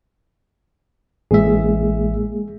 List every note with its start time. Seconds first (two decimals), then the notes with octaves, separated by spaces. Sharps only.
1.31 A1 G#3 A#3 G#4 E5